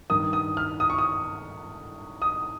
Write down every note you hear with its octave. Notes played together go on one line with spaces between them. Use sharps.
G2 D#3 D#6
D#6
F6
D#6
C#6
D#6
D#6